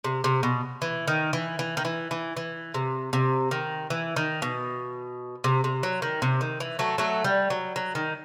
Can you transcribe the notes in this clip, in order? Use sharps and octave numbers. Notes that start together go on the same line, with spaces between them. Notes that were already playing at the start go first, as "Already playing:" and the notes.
C3
C3
B2
E3
D#3
E3
E3
D#3
E3
E3
E3
C3
C3
D#3
E3
D#3
B2
C3
C3
F#3
D#3
C3
D#3
E3
F#3 A3
F#3 A3
G3
F#3
F#3
D#3